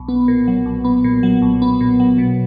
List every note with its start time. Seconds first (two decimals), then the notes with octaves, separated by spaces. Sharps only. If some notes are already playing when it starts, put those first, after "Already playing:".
Already playing: B1
0.08 B3
0.28 A#2
0.48 F#3
0.66 B1
0.84 B3
1.04 A#2
1.23 F#3
1.42 B1
1.62 B3
1.81 A#2
2.00 F#3
2.18 B2